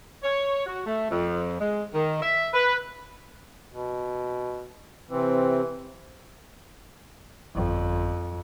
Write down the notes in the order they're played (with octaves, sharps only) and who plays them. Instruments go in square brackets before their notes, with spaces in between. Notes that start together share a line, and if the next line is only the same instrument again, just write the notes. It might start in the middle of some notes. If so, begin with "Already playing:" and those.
[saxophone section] C#5
F#4
A3
F2
G#3
D#3
E5
B4
[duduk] B2
[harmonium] C3 C4 [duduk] E3
[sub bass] G1 [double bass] F2